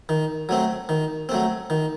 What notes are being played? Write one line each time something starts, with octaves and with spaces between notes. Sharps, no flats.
D#3
F#3 A3 C4
D#3
F#3 A3 C4
D#3